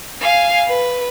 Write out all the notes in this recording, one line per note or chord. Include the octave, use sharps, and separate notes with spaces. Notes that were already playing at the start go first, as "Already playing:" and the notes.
F5 G#5
B4